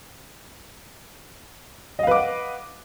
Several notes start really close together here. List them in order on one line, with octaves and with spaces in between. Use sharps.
D#5 F5 B4 D6 F#5